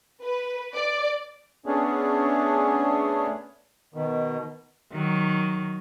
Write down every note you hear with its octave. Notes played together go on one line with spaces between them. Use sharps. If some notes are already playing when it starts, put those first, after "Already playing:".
B4
D5
A3 B3 C#4 D4 G#4
B2 D#3
D#3 F#3